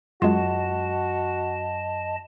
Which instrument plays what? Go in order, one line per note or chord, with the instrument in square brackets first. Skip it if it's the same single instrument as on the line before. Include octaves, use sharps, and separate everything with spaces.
[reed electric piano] F#2 [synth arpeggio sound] G#3 F4 [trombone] F#4 [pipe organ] D#5 A5